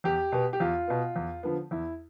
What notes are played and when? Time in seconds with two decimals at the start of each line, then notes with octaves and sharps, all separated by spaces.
0.04 E2 G4
0.32 B2 B3
0.53 G4
0.60 E2 F4
0.87 B2 B3
1.16 E2
1.43 D3 F3 B3
1.71 E2 E4